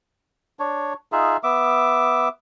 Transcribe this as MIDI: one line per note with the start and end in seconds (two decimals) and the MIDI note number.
0.59 0.93 62
0.59 0.93 73
1.12 1.37 63
1.12 1.37 65
1.12 1.37 68
1.12 1.37 76
1.43 2.29 59
1.43 2.29 76
1.43 2.29 86